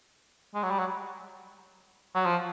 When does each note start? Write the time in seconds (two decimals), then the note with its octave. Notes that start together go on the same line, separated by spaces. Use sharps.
0.55 G#3
0.63 F#3
0.71 G3
0.79 F#3
2.15 F#3
2.26 F3